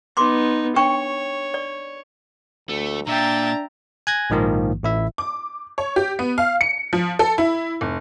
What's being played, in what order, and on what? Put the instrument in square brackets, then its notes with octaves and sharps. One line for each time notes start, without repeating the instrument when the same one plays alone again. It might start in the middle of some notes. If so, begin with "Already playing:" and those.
[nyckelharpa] B3 D#4 [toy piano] C6 D6
[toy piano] D4 G5 C#6 [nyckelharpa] C#5
[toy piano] D5
[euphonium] D2 [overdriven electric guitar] A3
[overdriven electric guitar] A#2 [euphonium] D4 [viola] E5 G5 [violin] A#5 A6
[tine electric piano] G#5 F#6 G#6 A#6
A#1 G#2 D#3 F3 A#3
A1 E4 E5
[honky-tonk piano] D6
C#5
G4
B3
F5
C#7
F3
A4
E4
F1